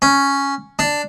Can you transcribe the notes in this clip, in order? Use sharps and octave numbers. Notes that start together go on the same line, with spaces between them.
C#4
D4